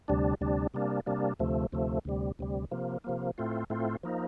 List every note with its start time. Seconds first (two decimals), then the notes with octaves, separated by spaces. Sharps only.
0.08 D2 C3 G3 D4
0.41 D2 C3 G3 D4
0.74 C3 G3 A#3 D4
1.06 C3 G3 A#3 D4
1.39 D2 C3 F3 A3
1.72 D2 C3 F3 A3
2.05 D2 C3 G3
2.39 D2 C3 G3
2.71 C3 F3 A#3
3.04 C3 F3 A#3
3.38 A2 A3 C4 F4
3.70 A2 A3 C4 F4
4.03 F3 A#3 D#4